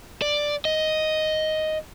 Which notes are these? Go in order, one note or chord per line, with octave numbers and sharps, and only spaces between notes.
D5
D#5